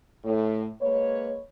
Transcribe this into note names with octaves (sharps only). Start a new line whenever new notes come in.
A2
G#3 A#3 B4 C#5